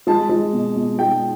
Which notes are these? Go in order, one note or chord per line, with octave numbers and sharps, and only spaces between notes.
G#3 A5
G#3
B2
B2
G#3 G5